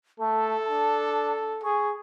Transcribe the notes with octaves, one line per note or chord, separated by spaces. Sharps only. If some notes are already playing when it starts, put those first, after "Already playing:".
A3 A4 A5
D4 A5
G#4 C#6